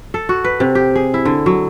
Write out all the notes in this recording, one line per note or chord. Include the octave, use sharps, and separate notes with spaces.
A4
F#4
B4
C3
G4
G#4
E4
D3
F#3